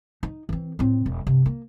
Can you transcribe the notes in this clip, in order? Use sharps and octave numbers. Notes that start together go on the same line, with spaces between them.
D#4
E3 C4
A2 C4
E1
G2 C3
A#3